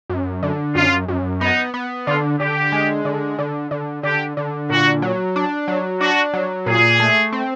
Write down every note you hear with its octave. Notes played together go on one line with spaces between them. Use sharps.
F#2
D3
F#2 F4
F#2
B3 D#4
B3
D3 F4
D3 G4
G#3
D3
D3
D3
D3 G4
D3
A#2 F#4
F#3
D4
F#3
D4 F#4
F#3
A#2 G#4
A3
C4